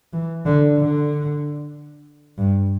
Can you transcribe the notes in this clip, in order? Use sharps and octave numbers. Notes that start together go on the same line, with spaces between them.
E3
D3
D3
G2